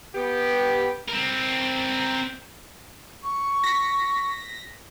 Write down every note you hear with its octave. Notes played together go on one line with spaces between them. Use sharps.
B3 G4
C4 A#4
C#6
A#6 B6